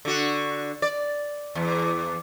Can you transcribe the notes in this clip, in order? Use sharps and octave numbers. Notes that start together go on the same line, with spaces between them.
D3 F#4
D5
E2